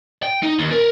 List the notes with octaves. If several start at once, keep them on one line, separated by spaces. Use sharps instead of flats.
G5
D#4
D#2
A#4